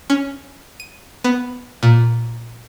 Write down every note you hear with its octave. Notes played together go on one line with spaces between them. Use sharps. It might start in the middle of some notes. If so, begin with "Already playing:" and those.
C#4
D#7
B3
A#2